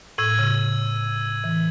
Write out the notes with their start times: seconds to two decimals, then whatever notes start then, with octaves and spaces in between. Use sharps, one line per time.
0.18 A2 E6 G#6 D#7 F#7
0.39 C#3
1.44 E3